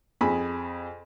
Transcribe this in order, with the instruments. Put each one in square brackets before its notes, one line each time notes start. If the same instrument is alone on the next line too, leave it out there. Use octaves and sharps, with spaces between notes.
[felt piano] F2 G#4 B5